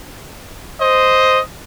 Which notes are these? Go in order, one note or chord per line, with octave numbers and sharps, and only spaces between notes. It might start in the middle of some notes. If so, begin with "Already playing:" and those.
C5 D#5